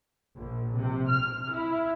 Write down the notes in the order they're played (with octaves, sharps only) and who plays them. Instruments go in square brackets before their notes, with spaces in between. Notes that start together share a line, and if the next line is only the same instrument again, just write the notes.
[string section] A#1
C3
F6
E4